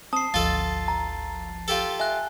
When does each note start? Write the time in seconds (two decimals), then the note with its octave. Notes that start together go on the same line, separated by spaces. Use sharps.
0.13 C4 A5 D#6 C7
0.34 G#1 D2 F3 F4 A4 A6
0.88 A#5
1.68 F4 G4 A4
2.00 E5 G#5 F#6